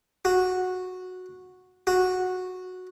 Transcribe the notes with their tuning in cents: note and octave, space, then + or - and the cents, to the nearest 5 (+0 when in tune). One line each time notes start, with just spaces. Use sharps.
F#4 -10
F#4 -10